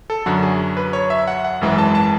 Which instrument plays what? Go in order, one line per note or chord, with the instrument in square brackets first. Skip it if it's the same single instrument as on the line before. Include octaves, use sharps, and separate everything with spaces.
[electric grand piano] A4
F#2 D3 F#3 F#4
G#4
B4
C#5
E5
F#5
F#5
G#1 F#2 E3 G#3
A5
A5